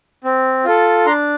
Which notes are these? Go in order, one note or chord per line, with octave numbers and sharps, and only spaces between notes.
C4
F4 A4
D4 A#5 C6